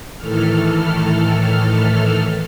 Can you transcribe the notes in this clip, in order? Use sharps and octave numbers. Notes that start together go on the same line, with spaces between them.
A2 D#3 E3 A4 F6